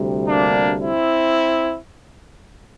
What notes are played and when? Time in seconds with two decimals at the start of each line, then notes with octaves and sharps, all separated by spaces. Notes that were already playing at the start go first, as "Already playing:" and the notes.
Already playing: D2 C3 G3
0.27 A#3 D4
0.81 C4 E4